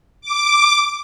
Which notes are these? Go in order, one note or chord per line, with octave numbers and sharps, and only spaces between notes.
D6